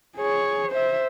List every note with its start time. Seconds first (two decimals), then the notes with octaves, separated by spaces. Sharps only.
0.17 G#4 C#5
0.72 C5 E5